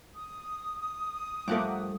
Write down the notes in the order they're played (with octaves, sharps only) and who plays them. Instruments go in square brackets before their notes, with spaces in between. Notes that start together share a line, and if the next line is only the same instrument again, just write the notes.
[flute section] D#6
[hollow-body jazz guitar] G2 F3 A3 [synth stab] A#4 F#5 D6